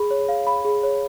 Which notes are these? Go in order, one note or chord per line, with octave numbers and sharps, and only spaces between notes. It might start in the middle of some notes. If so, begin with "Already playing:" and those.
Already playing: G#4 B5
C#5
F5
B5
G#4
C#5